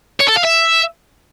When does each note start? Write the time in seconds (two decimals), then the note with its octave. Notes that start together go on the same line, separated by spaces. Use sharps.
0.20 C#5
0.28 A4
0.36 F5
0.44 E5